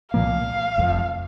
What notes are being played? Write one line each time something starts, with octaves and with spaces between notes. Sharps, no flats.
C2 A#2 F3 A#3 F5
F1 F2 F3